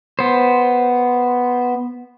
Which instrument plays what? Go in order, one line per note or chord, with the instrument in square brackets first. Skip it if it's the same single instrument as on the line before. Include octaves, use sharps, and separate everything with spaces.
[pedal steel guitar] B3 C5